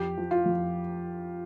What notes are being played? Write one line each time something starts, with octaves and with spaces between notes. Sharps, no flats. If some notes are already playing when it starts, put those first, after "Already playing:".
Already playing: F2 G4
F3
F4
F2